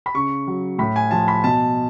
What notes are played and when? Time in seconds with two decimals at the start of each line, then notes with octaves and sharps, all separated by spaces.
0.06 B5
0.14 C#3 C#6
0.47 F#3
0.78 A2 B5
0.96 G#5
1.11 F3 A5
1.28 B5
1.44 B2 A5